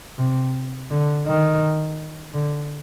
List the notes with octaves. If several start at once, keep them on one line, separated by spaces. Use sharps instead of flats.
C3
D3
D#3
D3